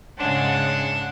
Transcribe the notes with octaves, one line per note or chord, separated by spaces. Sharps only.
G#2 C#3 G#3 D4 F#5 A5 C6